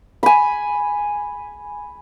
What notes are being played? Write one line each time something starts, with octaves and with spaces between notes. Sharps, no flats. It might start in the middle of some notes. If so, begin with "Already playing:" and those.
G#5 B5